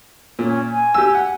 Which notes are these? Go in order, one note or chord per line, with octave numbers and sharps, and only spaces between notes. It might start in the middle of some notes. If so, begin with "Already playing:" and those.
A#2 C#4
G#5
G4 E6
F#5